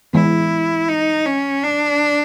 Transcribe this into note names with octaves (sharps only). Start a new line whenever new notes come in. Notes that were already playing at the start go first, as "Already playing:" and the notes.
E3 G#3 B3 E4
D#4
C#4
D4